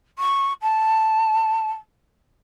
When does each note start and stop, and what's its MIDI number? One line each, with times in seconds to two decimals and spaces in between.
0.18 0.52 85
0.61 1.72 81